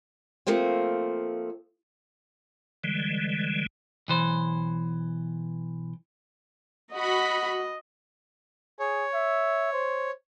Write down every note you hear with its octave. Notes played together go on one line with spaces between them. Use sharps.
F3 A3 A#3 C4
D3 E3 G3 G#3
B1 E3 C5
F#4 D#5 B5
G#4 C#5
E5
C5